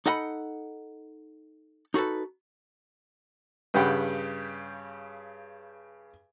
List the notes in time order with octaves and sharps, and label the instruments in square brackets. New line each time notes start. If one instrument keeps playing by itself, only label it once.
[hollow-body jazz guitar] D#4 A4 D#5 F#5 B5
D#4 F#4 G#4 A4 B4
[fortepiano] G2 C#3 G4 F#5 G5 B5